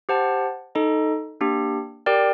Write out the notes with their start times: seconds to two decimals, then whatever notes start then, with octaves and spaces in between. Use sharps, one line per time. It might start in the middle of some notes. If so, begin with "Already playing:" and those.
0.09 G4 C5 F#5 A5
0.75 D#4 A4 D#5
1.41 A#3 D4 G4
2.06 G4 A#4 D5 G5